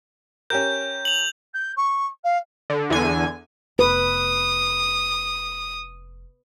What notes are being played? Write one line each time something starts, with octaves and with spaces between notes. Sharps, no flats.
C#4 G4 A#4 G6
F7 F#7
G6
C#6
F5
D3
E2 D3 G#5
F1 B4 D#6